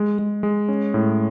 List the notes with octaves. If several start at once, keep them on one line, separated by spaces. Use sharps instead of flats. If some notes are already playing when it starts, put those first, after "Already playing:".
Already playing: G#3
G#3
G#3
C#4
A2